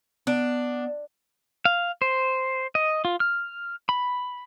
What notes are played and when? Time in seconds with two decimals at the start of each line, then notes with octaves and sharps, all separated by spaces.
0.27 B3 D4
1.65 F5
2.02 C5
2.75 D#5
3.05 F4
3.20 F6
3.89 B5